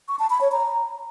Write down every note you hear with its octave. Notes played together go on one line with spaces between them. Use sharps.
C#6
A5
B5
C#5
A#5